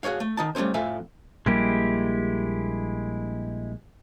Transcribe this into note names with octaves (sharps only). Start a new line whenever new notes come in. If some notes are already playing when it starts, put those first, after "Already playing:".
F#4 G#4 A#4 C#5 F5
A3
D#3 D#4 A5
G3 A3 C4 C#4 C5
F2 A2 A4 E5 F5 G#5
A#1 G3 G#3 A#3 E4 G4